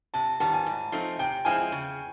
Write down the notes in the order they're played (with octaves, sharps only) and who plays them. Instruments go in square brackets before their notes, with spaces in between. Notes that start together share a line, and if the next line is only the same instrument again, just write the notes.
[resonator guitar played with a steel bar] C3 [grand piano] A5
[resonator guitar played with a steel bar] D#3 G3 B3 [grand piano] A5
[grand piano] G#5
[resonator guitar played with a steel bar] G#2
F3 A3 C4 D#4
[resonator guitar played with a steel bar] C3 [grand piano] G5
[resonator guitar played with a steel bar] F3 G#3 C4 E4 [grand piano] G#5
[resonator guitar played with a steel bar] C#3